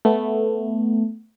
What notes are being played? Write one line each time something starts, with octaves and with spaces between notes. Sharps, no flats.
A3 B3